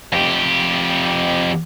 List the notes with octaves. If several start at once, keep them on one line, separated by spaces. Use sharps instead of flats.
F2 G4